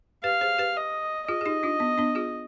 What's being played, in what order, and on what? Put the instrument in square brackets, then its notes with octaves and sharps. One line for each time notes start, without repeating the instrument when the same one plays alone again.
[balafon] G4 B4 [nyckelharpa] F5
[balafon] G#4 C5
G4 B4
[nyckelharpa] D#5
[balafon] F4 G#4 [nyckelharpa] D#5
[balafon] G#4
D#4 G4
D4 F4
B3
B3 D4
F4 G#4